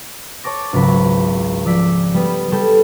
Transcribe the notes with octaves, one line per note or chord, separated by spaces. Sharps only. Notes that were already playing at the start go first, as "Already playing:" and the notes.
C#5 A5 D6 A#6
G#1 C#2 F#3 B5
F3 D5 E6 B6
G3 B3
G3 A4 G6 G#6 E7